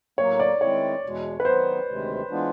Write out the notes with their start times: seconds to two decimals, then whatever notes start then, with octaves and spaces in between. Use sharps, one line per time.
0.18 A2 F#3 A#3 C#5
0.40 D5
0.61 D#3 G#3 C4 E4 C#5
1.04 E2 B2 G#3
1.40 B4
1.45 D#3 F#3 B3 C5
1.87 D2 C3 D#3 G#3
2.30 E3 G#3 B3 D4 F4